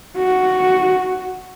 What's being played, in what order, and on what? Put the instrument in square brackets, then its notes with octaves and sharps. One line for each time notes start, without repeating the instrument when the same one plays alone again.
[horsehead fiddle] F#4